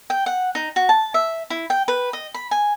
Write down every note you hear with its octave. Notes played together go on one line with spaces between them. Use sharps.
G5
F#5
D#4
F#4
A5
E5
E4
G5
B4
D#5
B5
G#5